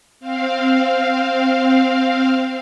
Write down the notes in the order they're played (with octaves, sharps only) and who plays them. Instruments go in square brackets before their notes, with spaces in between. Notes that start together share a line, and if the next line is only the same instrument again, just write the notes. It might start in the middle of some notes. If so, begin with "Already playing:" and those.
[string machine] C4 F5